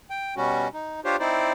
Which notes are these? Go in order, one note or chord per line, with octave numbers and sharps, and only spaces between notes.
G5
B2 G3 C#4 F#4
D#4
D4 F4 G4 C5 C#5
C4 D#4 E4 C5 D5